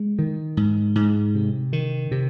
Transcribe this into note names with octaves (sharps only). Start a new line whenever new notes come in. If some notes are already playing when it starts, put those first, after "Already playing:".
Already playing: G#3
D#3
G#2
G#2
C3
D#3
C3